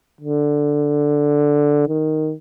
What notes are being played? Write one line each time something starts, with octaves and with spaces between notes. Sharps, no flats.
D3
D#3